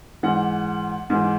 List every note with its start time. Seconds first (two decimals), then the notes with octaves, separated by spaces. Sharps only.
0.23 G#2 E3 F#5
1.10 G#2 E3